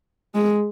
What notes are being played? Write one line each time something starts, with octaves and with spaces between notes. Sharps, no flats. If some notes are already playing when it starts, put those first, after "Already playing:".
G#3